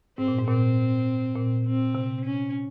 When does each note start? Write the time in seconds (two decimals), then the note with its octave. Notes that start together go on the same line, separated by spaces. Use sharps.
0.18 G#2 C4
0.28 A#2
0.38 G#2
0.48 A#2 C4
1.36 A#2
1.66 C4
1.95 C3
2.25 C#4